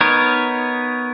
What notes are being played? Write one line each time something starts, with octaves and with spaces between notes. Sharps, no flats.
B3 D#4 A#4 C#5